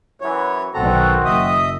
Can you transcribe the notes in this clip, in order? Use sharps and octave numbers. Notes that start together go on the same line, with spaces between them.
F#2 E3 C#5
B1 D#3 C4 F#4 A4 A#5
F#1 D#5 E5 D#6